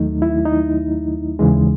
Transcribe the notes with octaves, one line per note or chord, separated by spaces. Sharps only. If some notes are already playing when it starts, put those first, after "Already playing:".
Already playing: D#2 D#3 F#3 A3 D#4
E4
D#4
D#2 C#3 E3 G#3